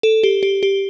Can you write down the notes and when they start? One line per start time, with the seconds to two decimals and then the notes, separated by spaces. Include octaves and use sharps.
0.03 A4
0.23 G4
0.43 G4
0.63 G4